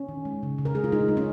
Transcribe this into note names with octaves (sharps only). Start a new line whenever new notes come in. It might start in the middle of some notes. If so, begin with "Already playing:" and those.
Already playing: C#4
D#3
G#3
C#3
C#3
A#4
G#3 G#4
F4
G#3 D#4
G#3
C#4